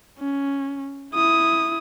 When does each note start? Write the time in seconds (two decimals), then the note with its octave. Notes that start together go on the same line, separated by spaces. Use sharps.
0.19 C#4
1.15 E4 D#6